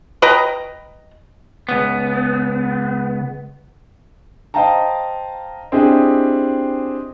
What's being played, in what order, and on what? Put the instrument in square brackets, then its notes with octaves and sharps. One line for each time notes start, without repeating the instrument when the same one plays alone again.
[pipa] B4 D#5 G5 A#5
[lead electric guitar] C#2 B3
[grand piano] C5 D#5 F5 G5 A5 A#5
C4 D4 E4 G4 G#4 D#5